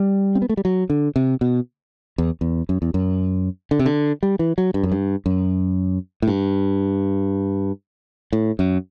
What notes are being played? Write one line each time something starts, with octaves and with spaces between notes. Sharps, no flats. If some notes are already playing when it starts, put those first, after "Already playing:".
Already playing: G3
C4
B3
A3
G3
F#3
D3
C3
B2
E2
E2
F#2
E2
F#2
D3
C3
D3
G3
E3
F#3
G2
F#2
G2
F#2
A2
G2
A2
F#2